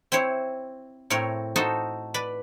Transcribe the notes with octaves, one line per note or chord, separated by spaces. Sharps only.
C4 E4 C5 C#5
A2 C4 A#4 C#5
D#4 F#4 A4 C5 D#5
B4 D5 B5